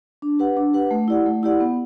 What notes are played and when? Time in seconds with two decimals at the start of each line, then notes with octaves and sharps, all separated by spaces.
0.22 D4
0.39 G4 B4 F#5
0.57 D4
0.74 G4 B4 F#5
0.91 A3
1.08 E4 G4 D5 F#5
1.26 A3
1.43 E4 G4 D5 F#5
1.60 B3